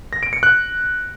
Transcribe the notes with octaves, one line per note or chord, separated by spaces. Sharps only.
A#6
D7
C#7
F#6